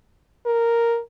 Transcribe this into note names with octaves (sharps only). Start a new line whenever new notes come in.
A#4